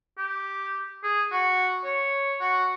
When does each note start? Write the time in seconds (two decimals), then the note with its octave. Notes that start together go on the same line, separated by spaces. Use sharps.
0.18 G4
1.03 G#4
1.32 F#4
1.84 C#5
2.40 F#4